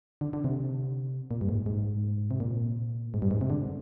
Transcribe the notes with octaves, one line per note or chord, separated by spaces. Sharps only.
D3
D3
C3
A#2
G2
G#2
G#2
C3
A#2
G#2
G2
G#2
C3
D3